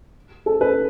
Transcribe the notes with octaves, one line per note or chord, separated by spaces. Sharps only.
A4
B4